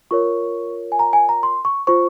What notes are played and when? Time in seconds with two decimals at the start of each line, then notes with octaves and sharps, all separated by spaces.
0.11 F4 A#4 C#5 C#6
0.92 G#5
0.99 A#5
1.13 G#5
1.29 A#5
1.43 C6
1.65 C#6
1.87 F4 C5 C#6